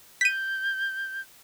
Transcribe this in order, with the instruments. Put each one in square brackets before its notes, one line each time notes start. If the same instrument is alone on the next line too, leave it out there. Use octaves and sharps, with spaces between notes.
[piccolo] G6 [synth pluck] B6 D#7